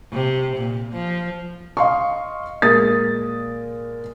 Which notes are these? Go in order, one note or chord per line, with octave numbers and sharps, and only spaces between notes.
C3
A#2
F3
D#5 F5 C6 C#6
A#2 G#3 A#4 D#6 A6